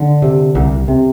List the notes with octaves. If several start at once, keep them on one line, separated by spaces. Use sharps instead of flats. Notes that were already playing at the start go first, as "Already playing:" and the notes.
Already playing: D3
C3
C2
C3